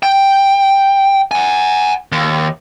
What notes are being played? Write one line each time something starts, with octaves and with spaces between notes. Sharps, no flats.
G5
F#5 G#5
D#2